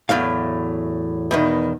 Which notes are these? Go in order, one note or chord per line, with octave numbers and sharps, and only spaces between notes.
E2 A2 F#3 F5
E2 B2 D#3